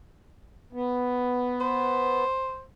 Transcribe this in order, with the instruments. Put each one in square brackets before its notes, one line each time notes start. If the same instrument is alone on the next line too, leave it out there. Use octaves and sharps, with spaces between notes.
[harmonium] B3
[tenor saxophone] C5